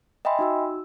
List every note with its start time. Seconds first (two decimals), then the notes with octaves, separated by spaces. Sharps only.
0.25 D#5 E5 G5 G#5 B5 C6
0.39 D#4 F#4 E6